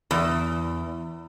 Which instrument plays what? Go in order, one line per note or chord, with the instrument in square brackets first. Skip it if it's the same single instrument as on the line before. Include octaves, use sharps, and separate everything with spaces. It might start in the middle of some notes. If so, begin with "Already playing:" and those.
[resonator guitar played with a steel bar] E2